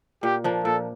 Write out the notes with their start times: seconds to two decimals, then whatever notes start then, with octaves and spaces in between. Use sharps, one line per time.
0.23 A#2 G4
0.44 F3 A#3 D4
0.64 A#2 A4